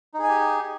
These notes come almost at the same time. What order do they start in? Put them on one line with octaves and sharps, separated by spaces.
D#4 G#4 G#5 G4